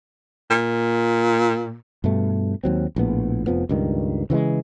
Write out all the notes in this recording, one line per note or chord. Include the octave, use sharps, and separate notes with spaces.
A#2
G2 B2 A3
D#2 F#3 C4
A#1 A2 B3
F1 F2 F3 B3
C#2 G2 D#3
C#3 E3 F#3 G#3